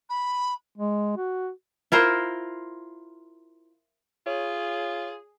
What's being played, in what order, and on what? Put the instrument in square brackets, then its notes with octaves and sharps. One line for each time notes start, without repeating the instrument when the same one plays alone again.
[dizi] B5
[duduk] G#3
F#4
[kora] E4 F4 A#4 C5
[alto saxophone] F4 [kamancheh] G#4 [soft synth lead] C#5